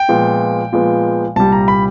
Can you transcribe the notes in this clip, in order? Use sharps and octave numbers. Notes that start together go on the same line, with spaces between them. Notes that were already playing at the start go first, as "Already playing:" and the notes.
Already playing: G5
A#2 F3 G#3 B3
A#2 F3 G#3 B3
C2 A#2 G3 A5
A#5
B5